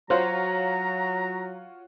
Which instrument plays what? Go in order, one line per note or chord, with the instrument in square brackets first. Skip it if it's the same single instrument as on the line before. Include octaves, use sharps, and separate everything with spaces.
[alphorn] F#3 [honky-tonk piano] F4 F#4 C#5 [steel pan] C5 [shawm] A#5